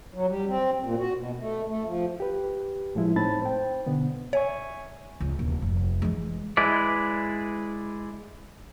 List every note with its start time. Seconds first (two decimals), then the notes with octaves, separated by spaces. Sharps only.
0.14 F#3
0.27 G3
0.48 C4
0.82 A#2
0.99 F#4
1.16 B2
1.39 A3
1.68 A3
1.84 F3
2.20 G4 B4
2.95 A2 F3 G#3 E4
3.16 A2 C4 D#4 A5 B5 A6
3.42 C5 G5
3.86 B2 D3 B3
4.33 C#5 E5 G#5 C#6
5.20 C#2
5.39 D#1
5.62 F1
6.02 E3 G#3
6.57 G#3 E4 B4 D5